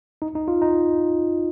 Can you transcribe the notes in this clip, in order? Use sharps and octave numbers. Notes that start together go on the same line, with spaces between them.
D#4
D#4
F4
D#4